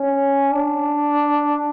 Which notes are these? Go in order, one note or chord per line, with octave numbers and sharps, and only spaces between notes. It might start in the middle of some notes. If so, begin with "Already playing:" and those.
Already playing: C#4
D4